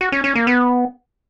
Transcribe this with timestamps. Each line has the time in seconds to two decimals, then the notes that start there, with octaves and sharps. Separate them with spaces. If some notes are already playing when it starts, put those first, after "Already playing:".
0.01 F#4
0.12 C#4
0.24 C#4
0.35 A#3
0.47 B3